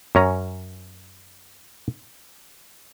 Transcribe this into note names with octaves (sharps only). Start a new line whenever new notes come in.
F#2 C#4 A#5